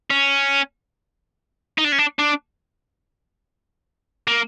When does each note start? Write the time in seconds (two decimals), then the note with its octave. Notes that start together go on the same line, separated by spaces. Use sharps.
0.11 C#4
1.78 D#4
1.84 D4
1.92 C#4
1.99 D4
2.19 D4
4.27 A#3